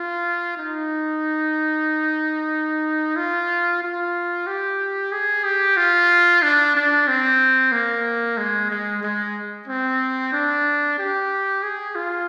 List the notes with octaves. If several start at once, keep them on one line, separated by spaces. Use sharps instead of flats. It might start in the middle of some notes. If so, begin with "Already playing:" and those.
Already playing: F4
D#4
F4
F4
G4
G#4
G4
F4
D4
D4
C4
A#3
G#3
G#3
G#3
C4
D4
G4
G#4
F4